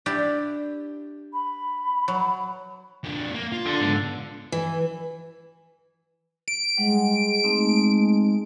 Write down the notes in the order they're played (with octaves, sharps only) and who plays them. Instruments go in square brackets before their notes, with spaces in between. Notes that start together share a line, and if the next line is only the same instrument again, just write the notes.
[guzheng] D4 E4 G4
[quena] B5
[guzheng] F#3
[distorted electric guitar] F2 D4
A#3
F4
[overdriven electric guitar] D3
[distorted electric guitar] G#2 B3
[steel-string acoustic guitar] E3
[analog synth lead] D7
[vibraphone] G3 F#5 [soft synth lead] G#3
[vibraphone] A3 C4 D#4